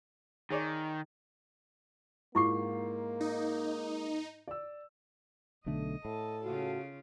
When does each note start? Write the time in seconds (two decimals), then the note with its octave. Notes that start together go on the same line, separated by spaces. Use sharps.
0.50 D#3 G#4 C#5 D5
2.35 G#2 A#3 E4 F4 C#6 D6 C7
3.21 D#4
4.48 D5 E6
5.66 B1 D3 A3 D#5
6.05 A2 A4 A5
6.43 C#3 F4 F#4